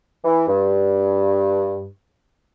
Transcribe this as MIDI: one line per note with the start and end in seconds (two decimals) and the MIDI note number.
0.24 0.45 52
0.47 1.86 43